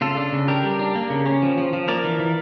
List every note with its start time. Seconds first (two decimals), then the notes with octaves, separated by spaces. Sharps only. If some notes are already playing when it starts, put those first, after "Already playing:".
0.01 C#3 F4 A4
0.17 D4
0.33 C#3
0.48 D4 G4 A#4
0.64 G3
0.79 D4
0.95 A#3
1.10 C#3
1.26 C#4
1.42 F3
1.58 F3
1.73 F3
1.88 A#3 A#4 D5
2.04 E3
2.19 E3